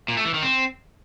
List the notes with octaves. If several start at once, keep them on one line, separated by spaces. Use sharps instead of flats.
A#2
A3
E3
D#3
C4